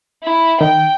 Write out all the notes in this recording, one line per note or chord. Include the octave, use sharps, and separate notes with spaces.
E4
D#3 G5